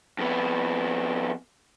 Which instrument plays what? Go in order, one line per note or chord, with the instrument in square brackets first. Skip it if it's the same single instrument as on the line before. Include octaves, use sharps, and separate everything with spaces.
[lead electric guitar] F2 B3